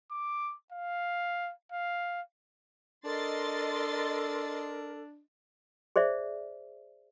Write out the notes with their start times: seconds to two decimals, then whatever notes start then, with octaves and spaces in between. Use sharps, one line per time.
0.11 D6
0.72 F5
1.72 F5
3.05 D4 A4 A#4 D#5 C6 A6
5.96 G#4 C5 D5 E5